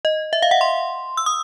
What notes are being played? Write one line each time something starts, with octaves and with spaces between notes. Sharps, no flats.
D#5
E5
F5
F#5
C6
E6
D#6